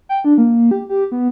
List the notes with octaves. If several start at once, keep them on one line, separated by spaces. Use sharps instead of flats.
G5
D4
A#3
G4
G4
B3